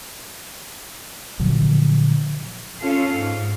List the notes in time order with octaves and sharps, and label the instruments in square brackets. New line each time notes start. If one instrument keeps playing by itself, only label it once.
[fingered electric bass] A#2 D3 F3 F#3
[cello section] C#4 F4 A4 F5
G#2